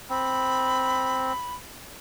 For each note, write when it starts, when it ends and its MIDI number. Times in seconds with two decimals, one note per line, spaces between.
0.10 1.33 60
0.10 1.55 83